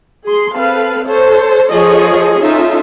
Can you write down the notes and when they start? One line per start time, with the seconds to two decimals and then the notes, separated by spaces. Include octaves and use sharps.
0.25 G#4 C6
0.55 C4 A4 B4 F5
1.07 A4 C5 C#5
1.71 F3 F4 G#4 A4 C#5 D#5
2.42 C#4 D#4 F4 A4 E5